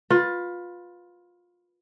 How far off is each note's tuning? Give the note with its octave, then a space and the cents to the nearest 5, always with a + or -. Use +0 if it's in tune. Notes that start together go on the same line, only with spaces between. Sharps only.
F4 +20 B4 +0